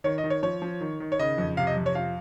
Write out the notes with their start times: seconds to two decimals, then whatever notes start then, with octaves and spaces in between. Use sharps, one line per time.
0.04 D#3 C#5
0.18 D#5
0.24 D#3
0.30 C#5
0.43 F3 C#5
0.62 F3
0.81 D#3
1.00 D#3
1.12 C#5
1.19 C#3 D#5
1.38 F2
1.57 C3 F5
1.67 D#5
1.76 F2
1.86 C#5
1.95 F3 F5